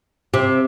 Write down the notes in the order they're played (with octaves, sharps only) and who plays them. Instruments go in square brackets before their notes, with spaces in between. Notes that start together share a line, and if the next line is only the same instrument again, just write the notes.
[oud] C3